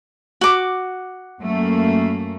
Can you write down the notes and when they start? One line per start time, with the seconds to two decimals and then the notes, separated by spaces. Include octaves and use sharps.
0.41 F#4 D6
1.40 F#2 A3 A#3